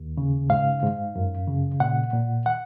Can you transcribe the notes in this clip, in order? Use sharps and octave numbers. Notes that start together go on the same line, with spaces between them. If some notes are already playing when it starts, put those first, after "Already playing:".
Already playing: D#2
C#3
G#2 F5
G#2
F#2
C#3
A#2 F#5
A#2
F#5